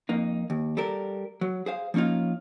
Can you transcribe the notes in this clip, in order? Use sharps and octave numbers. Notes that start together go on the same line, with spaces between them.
F2 A#3 D#4
D#2
G3 A4 A#4
F#3
G#4 C5 F5
F3 A#3 C#4 D#4 F4